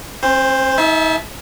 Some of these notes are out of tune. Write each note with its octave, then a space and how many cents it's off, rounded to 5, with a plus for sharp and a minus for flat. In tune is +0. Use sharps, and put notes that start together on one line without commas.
C4 +45 C5 +0
D#4 +40 E5 +0 A5 -35